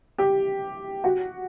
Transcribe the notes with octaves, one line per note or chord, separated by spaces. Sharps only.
G4
F#4